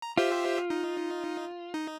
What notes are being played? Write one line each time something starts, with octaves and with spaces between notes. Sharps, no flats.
A#5
F4 G4 C5 E5
D#4
D#4